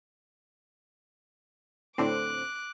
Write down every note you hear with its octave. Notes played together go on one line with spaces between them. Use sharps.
A2 D3 C4 D6 F#6